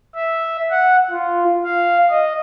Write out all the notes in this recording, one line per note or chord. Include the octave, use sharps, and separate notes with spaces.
E5
F#5
F4
F5
D#5